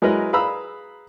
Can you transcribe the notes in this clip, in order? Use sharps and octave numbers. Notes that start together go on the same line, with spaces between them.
F#3 G#3 E4 A#4 B4 D#5
G#4 B4 F5 A#5 B5 E6